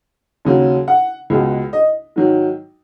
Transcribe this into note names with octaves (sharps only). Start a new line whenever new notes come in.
D#2 C#3 F#3
F#5
C#2 B2 G#3
D#5
G#2 D#3 F#3